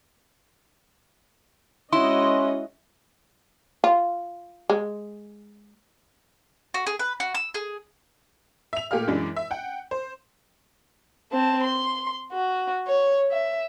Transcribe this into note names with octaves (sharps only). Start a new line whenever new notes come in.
G#3 C#4 E4 F#4 D#5 C6
F4
G#3
F#4
G#4
B4
F#4
E6
G#4
E5 F7
A#2 A3 G4 G#4 F5 F6
F#2 E3 G#3 D4
E5
F#5 G5
C5
C4 A5
C6
F#4
C#5
E5